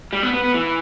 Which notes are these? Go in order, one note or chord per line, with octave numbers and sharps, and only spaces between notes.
G3
B3
B3
B3
E3